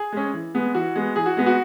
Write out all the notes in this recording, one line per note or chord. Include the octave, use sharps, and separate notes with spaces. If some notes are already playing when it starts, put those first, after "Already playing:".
Already playing: G#4
G#3 C#4
E3
G#3 B3
E3 F#4
G#3 B3
E3 G#4
F#4
G#3 B3
F#4